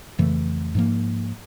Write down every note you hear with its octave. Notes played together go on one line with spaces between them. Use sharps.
F2 C#3 E3 A3
G#2 F3 A#3